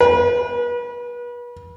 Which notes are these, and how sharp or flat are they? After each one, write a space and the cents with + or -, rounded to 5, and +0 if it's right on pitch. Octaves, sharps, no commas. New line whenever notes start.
B4 -35